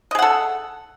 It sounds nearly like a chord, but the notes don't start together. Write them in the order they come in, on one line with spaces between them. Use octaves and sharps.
D#5 G#4 F#5 A4